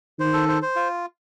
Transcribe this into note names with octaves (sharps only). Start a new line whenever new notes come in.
D#3 C5
A4
C5
C5
F4